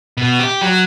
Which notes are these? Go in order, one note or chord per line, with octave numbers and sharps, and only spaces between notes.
B2
G4
F#3